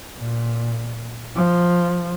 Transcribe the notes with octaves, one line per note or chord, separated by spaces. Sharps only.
A#2
F3